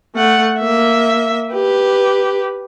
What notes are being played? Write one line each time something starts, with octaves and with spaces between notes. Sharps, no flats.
A3 F#5
A#3 E5
G4 B4